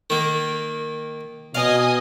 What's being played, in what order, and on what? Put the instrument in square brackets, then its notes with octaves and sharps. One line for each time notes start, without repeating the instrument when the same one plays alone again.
[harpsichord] D#3 A#3
[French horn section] B2 [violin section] D#5 G#5 D#6 [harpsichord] F5